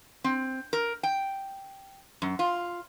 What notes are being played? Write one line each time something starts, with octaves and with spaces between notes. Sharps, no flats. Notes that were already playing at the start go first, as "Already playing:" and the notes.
C4
A#4
G5
F#2
F4